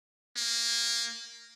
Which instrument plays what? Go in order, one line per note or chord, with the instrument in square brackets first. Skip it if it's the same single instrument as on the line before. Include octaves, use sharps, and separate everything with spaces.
[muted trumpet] A#3